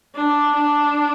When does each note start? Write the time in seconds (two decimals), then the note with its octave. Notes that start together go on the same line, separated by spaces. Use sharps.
0.16 D4
0.55 D4